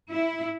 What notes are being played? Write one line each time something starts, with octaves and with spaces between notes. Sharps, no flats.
E4